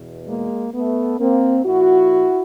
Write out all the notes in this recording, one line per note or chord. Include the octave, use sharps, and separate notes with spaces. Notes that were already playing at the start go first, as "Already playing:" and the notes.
Already playing: E2 B2
G#3 A#3
A3 B3
A#3 C4
A#2 F3 E4 F#4